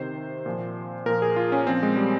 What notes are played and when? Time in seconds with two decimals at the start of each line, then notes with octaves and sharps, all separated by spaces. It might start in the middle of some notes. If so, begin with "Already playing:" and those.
Already playing: C3 D#3 C5
0.46 A#2 F3
1.06 A#2 F3 A#4
1.22 G#4
1.36 F4
1.52 C#4
1.67 A#2 F3 C4
1.83 G#3
1.97 G3